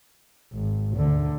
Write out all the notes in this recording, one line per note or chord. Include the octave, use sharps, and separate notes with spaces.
G#1
D2 D3